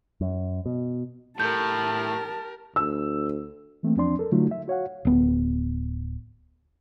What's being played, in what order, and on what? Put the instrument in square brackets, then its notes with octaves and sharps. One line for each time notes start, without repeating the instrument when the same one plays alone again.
[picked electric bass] F#2
B2
[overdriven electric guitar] A2 [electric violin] G4 A#4 [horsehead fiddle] A5 [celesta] G6
[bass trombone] D2 [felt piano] E6
[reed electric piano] E3 A3 A#3 C4
E2 F3 C4 D4 D5 C6
A4 A#4
D3 F#3 A3 D#4 F4 F#4
E5
F#4 C#5 F5 F#5
[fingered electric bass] D1 B3